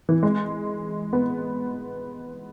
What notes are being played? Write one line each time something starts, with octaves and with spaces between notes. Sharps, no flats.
E3
G#3
B3